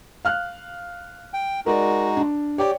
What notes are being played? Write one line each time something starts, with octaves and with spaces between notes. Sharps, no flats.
F5 F6 F#6
G5
G#3 D#4 F#4 A#4 D5
D4
G4 C#5 D5 G5